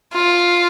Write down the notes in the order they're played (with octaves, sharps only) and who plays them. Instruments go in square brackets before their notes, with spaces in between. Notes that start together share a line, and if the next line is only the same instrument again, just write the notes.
[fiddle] F4